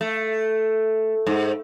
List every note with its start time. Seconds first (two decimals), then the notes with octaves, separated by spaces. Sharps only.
0.01 A3
1.27 G#2